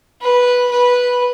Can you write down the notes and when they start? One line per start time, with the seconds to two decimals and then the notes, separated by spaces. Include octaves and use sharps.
0.22 B4
0.70 B4